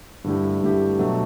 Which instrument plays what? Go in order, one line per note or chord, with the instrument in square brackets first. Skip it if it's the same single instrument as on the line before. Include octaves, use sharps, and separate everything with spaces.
[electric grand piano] G2 D3 A3 E4 G4
G2 D3 A3 E4 G4
B2 F#3 A3 D4 A4